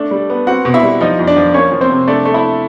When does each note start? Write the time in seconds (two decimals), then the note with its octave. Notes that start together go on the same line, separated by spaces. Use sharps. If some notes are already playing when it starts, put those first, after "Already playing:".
Already playing: A3 D4
0.11 G3
0.30 B3
0.47 C4 F#4 F#5
0.65 B2
0.74 E4 E5
0.83 G3
1.00 F3 D#4 D#5
1.19 F2
1.27 D4 D5
1.36 F3
1.54 A#3 C#4 C#5
1.72 F3
1.81 C4 C5
1.90 C3
2.07 A3 D4 D5
2.25 A3
2.34 E4 E5